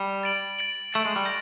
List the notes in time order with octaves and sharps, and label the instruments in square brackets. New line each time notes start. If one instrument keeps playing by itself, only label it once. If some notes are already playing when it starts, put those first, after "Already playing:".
Already playing: [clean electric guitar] G3
[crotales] A6 D7 F#7
A6 D7 F#7
[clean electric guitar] A3 [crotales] A6 D7 F#7
[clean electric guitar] G#3
G3
[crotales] G6 A#6 D7